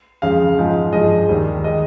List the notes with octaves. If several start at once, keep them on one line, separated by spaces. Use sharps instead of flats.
F2 C#3 G#3 F5
G#2 F3 G#3
G2 F3 G#3 D#5
D#2 D#3 G3
D#3 G#3 D#5